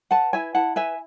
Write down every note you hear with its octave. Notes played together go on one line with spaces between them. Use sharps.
B4 F#5 A5
E4 E5 G#5
E4 F#5 A5
B4 E5 G#5